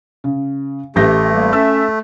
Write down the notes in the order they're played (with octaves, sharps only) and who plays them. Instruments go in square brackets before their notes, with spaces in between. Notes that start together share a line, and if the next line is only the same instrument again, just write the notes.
[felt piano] C#3
[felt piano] A1 G6 A#6 [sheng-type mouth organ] A3 [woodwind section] G4
[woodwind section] G3 A#3
[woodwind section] C#4 E5 [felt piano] A4 E6